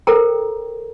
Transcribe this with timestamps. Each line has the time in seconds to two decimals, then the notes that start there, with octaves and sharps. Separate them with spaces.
0.07 A4 A#4 C5 G5 A#5